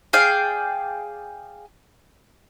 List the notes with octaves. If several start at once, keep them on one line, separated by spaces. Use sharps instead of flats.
G#4 D5 F5 G5